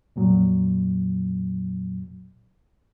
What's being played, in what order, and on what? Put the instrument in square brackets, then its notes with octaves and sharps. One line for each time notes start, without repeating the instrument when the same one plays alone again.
[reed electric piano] F2 A#2 F#3